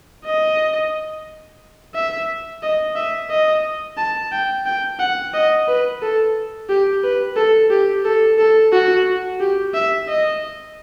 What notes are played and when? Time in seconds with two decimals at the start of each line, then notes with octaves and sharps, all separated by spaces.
0.25 D#5
1.94 E5
2.63 D#5
2.96 E5
3.30 D#5
3.97 A5
4.32 G5
4.65 G5
4.99 F#5
5.33 D#5
5.68 B4
6.02 A4
6.69 G4
7.03 B4
7.36 A4
7.70 G4
8.05 A4
8.38 A4
8.72 F#4
9.40 G4
9.74 E5
10.08 D#5